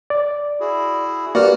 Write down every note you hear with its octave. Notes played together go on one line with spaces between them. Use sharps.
D5
E4 F#4 G#4
G2 A#3 F#4 D5 F6